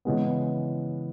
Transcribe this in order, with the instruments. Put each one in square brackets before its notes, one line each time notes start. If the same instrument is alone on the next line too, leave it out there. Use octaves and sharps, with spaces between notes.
[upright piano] C#3 E3 G#3 B3